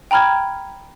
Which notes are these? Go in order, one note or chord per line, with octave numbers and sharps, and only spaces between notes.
G5 A#5 B5 F6 G#6